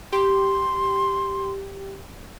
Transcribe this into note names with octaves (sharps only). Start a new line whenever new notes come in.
G4 C6